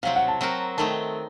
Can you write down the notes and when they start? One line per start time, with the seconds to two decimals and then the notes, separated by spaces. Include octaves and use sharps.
0.03 C3 F#3 C4 F5
0.16 F#5
0.28 A5
0.41 F#3 C4 F#4 A#4
0.77 D#3 A3 C4 D#4 A5